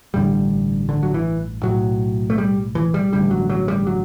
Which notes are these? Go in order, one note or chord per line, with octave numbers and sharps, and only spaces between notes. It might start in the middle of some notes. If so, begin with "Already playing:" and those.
A1 G2 D3 G3
D3
F#3
E3
B1 A2 F#3
A3
G3
E3
G3
A1 G2 D3 G3
F#3
F#3
G3
F#3